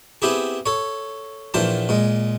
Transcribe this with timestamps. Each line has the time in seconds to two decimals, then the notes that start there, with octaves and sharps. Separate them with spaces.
0.22 B3 C4 E4 G4 G#4
0.66 A4 C#5
1.54 A#1 A#2 E3 C5 A5
1.89 A#2 G#3